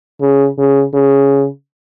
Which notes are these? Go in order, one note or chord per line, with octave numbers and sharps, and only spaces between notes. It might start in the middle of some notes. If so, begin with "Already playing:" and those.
C#3
C#3
C#3